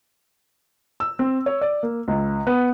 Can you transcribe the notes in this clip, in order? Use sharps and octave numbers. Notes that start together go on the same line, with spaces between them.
E6
C4
C#5
D5
A#3
C#2
B3